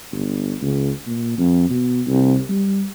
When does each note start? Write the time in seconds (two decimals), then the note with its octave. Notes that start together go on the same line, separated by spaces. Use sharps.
0.12 G1
0.61 C#2
1.07 A#2
1.38 F2
1.70 B2
2.07 C2
2.50 G3